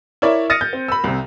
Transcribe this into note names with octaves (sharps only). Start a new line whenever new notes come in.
E4 A#4 C#5 D5 E5
D#6 F6 A6 A#6 C#7 D#7
G6
C4
B5 E6
C2 C3